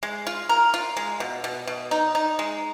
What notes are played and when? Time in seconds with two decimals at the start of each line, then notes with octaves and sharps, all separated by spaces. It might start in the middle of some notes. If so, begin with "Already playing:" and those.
0.03 G#3
0.27 F4
0.49 A#4
0.74 F4
0.97 G#3
1.20 B2
1.44 B2
1.67 B2
1.91 D#4
2.15 D#4
2.39 G#3